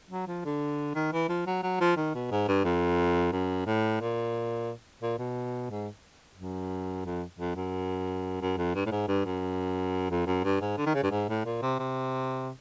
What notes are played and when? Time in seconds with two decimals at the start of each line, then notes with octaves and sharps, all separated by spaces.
0.11 F#3
0.27 F3
0.45 D3
0.95 D#3
1.13 E3
1.29 F3
1.47 F#3
1.63 F#3
1.81 F3
1.96 D#3
2.14 B2
2.31 G#2
2.48 G2
2.64 F2
3.32 F#2
3.66 A2
4.01 A#2
5.02 A#2
5.18 B2
5.70 G#2
6.37 F#2
7.05 F2
7.39 F2
7.56 F#2
8.41 F#2
8.57 F2
8.75 G2
8.86 A2
8.91 G#2
9.08 G2
9.25 F#2
10.10 F2
10.26 F#2
10.44 G2
10.61 G#2
10.78 D3
10.86 D#3
10.94 C#3
11.03 G2
11.11 G#2
11.29 A2
11.45 A#2
11.62 C3
11.79 C3